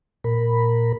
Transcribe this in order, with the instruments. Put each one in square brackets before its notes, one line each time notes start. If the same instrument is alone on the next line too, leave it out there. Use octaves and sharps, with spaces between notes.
[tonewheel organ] A#2 A#4 B5